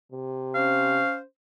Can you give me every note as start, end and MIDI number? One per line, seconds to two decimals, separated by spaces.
0.12 1.01 48
0.55 1.21 61
0.55 1.21 72
0.55 1.15 77